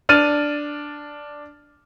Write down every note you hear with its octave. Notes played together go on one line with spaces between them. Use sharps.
D4 F6 A6 D#7